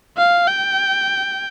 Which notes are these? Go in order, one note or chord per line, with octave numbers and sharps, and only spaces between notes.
F5
G5